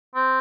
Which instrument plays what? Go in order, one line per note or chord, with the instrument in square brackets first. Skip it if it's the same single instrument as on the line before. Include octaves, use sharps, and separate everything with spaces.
[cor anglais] C4